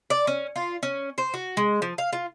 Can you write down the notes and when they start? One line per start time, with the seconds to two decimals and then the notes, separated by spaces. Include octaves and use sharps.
0.10 D5
0.27 C#4
0.56 F4
0.83 C#4
1.18 C5
1.34 F#4
1.57 G#3
1.82 F3
1.98 F5
2.13 F4